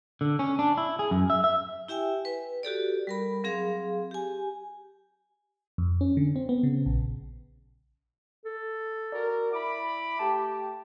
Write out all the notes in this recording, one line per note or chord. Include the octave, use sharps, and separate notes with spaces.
D3
C#4
D4
E4
G#4
F#2
E5
E5
E4 G4 E5 G5 G#5
B4
F#4 G4 A4 D5
G3 A#4 B5
F#3 C4 G#4 F5
G4 G#5
F2
C#4
D3
C4
B3
C#3
A#1
A4
F#4 A#4 D5
E4 B5 D6
A3 G4 A5